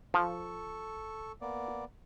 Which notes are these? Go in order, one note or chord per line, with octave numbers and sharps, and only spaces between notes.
F3 A4 C#6
A#3 B3 D5